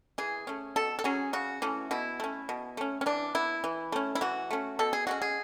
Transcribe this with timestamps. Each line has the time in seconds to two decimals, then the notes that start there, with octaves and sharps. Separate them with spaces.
0.18 E3 G#4
0.47 A3 C#4
0.76 B2 A4
0.99 A4
1.04 F#3 C#4 G#4
1.33 C#3 F#4
1.62 E3 A3 C#4
1.91 B2 E4
2.20 A3 C#4
2.49 B2
2.77 A3 C#4
3.01 C#4
3.06 E3 D4
3.35 B3 E4
3.64 E3
3.92 A3 C#4
4.15 E4
4.21 E3 F#4
4.51 A3 C#4
4.79 B2 A4
4.93 G#4
5.07 G#3 C#4 F#4
5.22 G#4